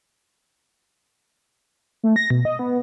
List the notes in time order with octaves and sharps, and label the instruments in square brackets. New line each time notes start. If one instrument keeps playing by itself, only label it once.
[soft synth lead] A3
A#6
B2
D#5
B3